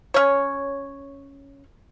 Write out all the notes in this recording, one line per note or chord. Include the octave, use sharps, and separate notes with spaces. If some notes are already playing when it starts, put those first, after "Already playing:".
C#4 C#5